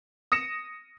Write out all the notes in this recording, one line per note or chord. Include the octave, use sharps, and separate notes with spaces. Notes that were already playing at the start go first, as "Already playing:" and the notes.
D#6 A#6 C#7 E7